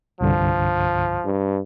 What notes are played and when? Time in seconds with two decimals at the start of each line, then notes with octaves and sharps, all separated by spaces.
0.21 C2 G2 D3 F3
1.25 G2